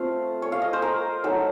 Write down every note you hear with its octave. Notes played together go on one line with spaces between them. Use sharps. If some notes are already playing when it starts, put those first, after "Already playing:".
Already playing: A3 C4 F4 F5
C#5
F5
D#5
C5
A#4
F#3 A3 D#4 A4